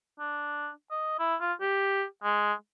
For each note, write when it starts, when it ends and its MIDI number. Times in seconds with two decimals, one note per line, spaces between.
0.20 0.70 62
0.90 1.19 75
1.19 1.36 64
1.41 1.53 65
1.61 2.05 67
2.23 2.53 56